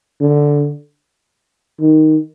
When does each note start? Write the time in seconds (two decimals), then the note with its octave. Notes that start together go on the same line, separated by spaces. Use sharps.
0.21 D3
1.81 D#3